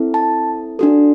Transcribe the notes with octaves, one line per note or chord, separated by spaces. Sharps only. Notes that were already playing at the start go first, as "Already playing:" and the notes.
Already playing: C4 E4 A4
A5
D4 F#4 A4